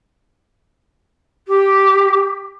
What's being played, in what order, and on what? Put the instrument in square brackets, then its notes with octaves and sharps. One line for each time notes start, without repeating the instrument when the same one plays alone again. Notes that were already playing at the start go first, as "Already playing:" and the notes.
[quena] G4